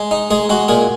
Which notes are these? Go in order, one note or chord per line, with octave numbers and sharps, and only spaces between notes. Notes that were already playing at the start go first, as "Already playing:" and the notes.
Already playing: G#3
D#4
G#3 G#4
G#3 F#4
A#2 G#4